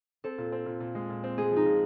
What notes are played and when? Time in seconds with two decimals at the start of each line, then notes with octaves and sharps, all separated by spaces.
0.24 C4 A4
0.38 A#2
0.52 C4
0.66 A#2
0.80 A#2
0.95 G#3
1.10 A#2
1.24 C4
1.38 G#3 G#4
1.51 F3
1.56 D#4
1.66 A#2